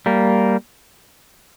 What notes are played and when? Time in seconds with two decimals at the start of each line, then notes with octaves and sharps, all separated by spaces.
0.06 G3 A#3